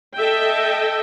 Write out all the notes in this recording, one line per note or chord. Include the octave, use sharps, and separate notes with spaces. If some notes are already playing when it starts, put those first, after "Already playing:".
A4 D#5 E5 G5